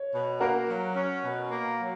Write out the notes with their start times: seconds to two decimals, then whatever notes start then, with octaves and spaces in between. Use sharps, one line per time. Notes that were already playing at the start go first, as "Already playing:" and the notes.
Already playing: C#5
0.13 B2
0.41 A#3 F#4 A#4
0.68 F#3
0.96 C#4
1.25 B2
1.51 A#3
1.80 F#3